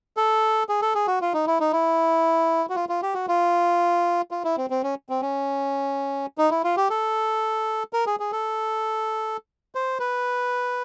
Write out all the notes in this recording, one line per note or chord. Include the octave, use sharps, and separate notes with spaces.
A4
G#4
A4
G#4
F#4
F4
D#4
E4
D#4
E4
F#4
F4
F4
G4
F#4
F4
F4
E4
C4
C4
C#4
C4
C#4
D#4
E4
F4
G4
A4
A#4
G#4
G#4
A4
C5
B4